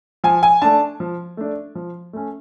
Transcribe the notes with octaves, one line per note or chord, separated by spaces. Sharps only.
F3 G#5
G#5
A3 D4 A5
F3
A3 D4
F3
A3 C#4